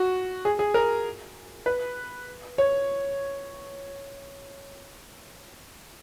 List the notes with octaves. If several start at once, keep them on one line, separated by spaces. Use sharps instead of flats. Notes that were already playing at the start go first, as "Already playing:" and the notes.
Already playing: F#4
G#4
G#4
A#4
B4
C#5